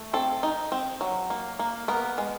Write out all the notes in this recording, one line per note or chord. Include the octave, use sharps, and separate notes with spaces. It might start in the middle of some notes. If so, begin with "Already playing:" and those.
Already playing: A3
C4 A4
D#4
C4
F#3
A#3
A#3
B3 A#4
G#3